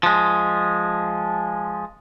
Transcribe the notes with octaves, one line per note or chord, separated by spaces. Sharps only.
F3 G#3